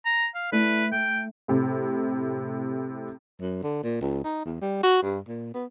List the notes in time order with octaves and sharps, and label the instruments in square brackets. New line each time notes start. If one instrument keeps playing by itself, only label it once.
[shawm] A#5
F5
[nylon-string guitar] A3 E4 D5 [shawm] B4
[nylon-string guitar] A3 [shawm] G5
[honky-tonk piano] A2 C3
[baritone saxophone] F#2
D3
A#2
C#2
D#4
E2
G3
F#4
G2
A#2
B3